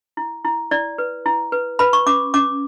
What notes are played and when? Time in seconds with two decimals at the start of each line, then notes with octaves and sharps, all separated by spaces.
0.17 E4
0.44 E4
0.71 E4 D5
0.98 B4
1.26 E4
1.52 B4
1.79 B4 B5
1.93 C#6
2.06 C#4 D6
2.34 C#4 D6